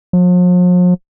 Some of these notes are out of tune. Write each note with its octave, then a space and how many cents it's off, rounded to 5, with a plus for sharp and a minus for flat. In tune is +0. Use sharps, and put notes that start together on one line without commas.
F3 +45